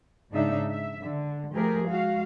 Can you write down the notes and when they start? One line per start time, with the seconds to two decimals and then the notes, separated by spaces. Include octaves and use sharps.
0.32 G#2 C#3 D4 D#4 E5
0.69 E5
1.03 D3
1.54 F3 A3 G4 G#4 A#4
1.88 G#3 F#4 F5